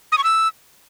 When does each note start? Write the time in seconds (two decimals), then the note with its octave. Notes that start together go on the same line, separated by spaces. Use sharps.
0.12 D#6
0.18 C#6
0.24 E6